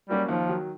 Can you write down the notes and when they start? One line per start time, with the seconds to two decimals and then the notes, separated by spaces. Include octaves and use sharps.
0.09 F#3 G3 A#3 C#4 F#4
0.28 D#2 F3
0.49 D#3 F#3